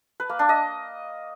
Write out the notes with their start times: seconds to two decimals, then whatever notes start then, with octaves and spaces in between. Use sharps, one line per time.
0.20 B4
0.29 A#3
0.39 D4
0.49 D#5